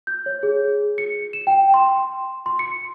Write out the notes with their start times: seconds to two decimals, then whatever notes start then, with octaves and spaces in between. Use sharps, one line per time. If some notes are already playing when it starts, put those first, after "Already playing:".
0.07 G6
0.26 C#5
0.43 G#4
0.98 C#7
1.33 E7
1.47 G5
1.74 C6
2.46 C6
2.59 C#7